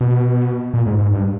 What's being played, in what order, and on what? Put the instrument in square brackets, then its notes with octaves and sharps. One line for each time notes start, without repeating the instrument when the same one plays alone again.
[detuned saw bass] B2
A#2
G#2
G#2
G2